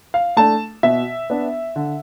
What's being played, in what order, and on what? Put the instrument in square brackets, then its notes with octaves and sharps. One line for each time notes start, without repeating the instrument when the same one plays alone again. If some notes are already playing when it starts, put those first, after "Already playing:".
[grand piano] F5
A3 D4 A5
B2 E5
B3 D4
D3